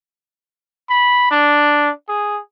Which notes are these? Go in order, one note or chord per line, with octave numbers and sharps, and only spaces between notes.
B5
D4
G#4